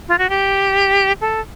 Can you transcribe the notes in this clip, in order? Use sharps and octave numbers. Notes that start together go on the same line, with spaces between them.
F4
F#4
G4
A4